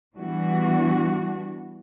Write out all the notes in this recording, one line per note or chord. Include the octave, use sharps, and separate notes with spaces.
E3 G3 B3 D4 F#4